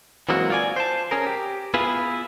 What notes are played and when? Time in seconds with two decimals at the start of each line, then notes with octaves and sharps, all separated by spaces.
0.29 E3 F#3 G#3 A#3 C4 F#4
0.50 F4 D5 G#5
0.76 C5 A5
1.11 C#4 G#4 A#4
1.26 G4
1.74 B3 E4 F4 G#4 B4